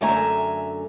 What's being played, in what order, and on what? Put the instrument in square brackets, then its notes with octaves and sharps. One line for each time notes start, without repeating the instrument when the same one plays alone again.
[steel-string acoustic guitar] F#2 D3 A3 E5 G#5 A#5